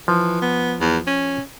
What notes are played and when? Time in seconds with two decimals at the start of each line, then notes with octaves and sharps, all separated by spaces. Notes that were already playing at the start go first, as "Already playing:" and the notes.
0.08 E3 F3
0.42 B3
0.81 E2
1.07 C#4